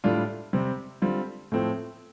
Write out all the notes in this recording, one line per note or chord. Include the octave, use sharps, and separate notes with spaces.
A2 G3 D4 F4
C3 G3 C4
D3 G3 C4 F4
A2 F3 A3 C4